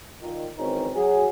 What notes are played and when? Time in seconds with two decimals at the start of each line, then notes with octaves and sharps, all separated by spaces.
0.21 A#2 D#3
0.58 G#1 D#3 E3 C4 C#4 D#4
0.95 F#3 G#4